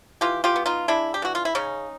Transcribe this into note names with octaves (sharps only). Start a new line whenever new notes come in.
E3 F4 G4
F4 G4
B3
D#4 F4
G#3 D4 E4
G4
E3 F#4
F4
E4
C#3 C#4 D#4